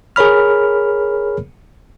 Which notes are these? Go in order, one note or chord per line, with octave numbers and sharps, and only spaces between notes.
G#4 A#4 C#5 B5 F6